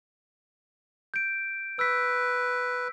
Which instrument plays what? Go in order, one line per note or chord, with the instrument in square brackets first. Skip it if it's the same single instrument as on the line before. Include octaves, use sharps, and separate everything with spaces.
[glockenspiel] G6 D7
[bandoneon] B4 [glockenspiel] E6 B6